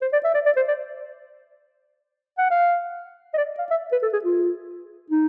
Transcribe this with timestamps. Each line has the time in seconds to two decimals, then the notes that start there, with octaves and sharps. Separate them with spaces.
0.02 C5
0.13 D5
0.24 E5
0.34 D5
0.46 D5
0.57 C5
0.68 D5
2.38 F#5
2.51 F5
3.34 D#5
3.38 D5
3.59 F5
3.71 E5
3.92 B4
4.03 A4
4.13 G#4
4.25 F4
5.11 D#4